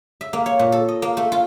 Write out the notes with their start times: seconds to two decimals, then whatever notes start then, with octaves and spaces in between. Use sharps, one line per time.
0.21 E5
0.33 A#3
0.46 C#5
0.59 A#2
0.72 A4
0.89 D#5
1.02 A#3
1.17 A3
1.32 F4